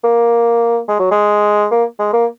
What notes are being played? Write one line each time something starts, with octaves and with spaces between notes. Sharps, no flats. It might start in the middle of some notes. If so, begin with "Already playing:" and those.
A#3
G#3
F#3
G#3
A#3
G#3
A#3